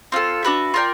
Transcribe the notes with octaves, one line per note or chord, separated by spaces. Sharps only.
C4 F4 A4
D4 F#4 B4 E5
F4 A#4 D5 G5